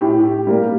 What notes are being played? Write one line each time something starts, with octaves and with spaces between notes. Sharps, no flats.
A2 G4
G3 A#3